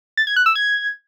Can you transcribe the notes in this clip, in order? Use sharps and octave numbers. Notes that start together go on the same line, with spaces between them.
A6
G#6
F#6
E6
G#6